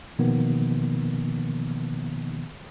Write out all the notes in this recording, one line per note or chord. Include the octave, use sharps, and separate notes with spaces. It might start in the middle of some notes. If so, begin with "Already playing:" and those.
B2 D#3 F3 A#3 B3